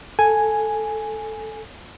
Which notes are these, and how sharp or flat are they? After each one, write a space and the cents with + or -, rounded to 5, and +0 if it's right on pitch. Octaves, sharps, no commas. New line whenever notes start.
A4 +0 G#5 +0